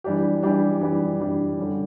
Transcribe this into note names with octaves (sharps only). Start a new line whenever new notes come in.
E3 G3 D4 G4
E3 G3 D4 G4
E3 G3 D4 G4
E3 G3 D4 G4
D3 G3 C#4